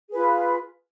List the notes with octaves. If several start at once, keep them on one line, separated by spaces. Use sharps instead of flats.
F4 G#4 B4